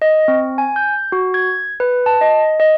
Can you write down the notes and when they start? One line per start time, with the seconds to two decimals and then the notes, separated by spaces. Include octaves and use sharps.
0.02 D#5
0.28 C4
0.58 G#5
0.76 G6
1.12 F#4
1.34 G#6
1.80 B4
2.06 A5
2.21 D#5
2.60 D#5